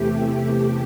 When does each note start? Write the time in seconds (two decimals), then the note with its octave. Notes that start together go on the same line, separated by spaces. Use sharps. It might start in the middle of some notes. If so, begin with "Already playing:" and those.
Already playing: E2 C3 E3 A3 G4
0.24 G4